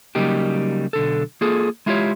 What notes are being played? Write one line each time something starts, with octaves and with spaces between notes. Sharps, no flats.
C#3 F#3 G3 A#3 D#4 G4
B1 D3 A4
A#3 F4 G#4 A4
G#3 E4 F4 G4 A4 C#5